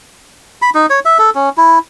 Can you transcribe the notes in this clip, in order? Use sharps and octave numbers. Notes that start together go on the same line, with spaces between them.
B5
D#4
C#5
E5
A4
C#4
E4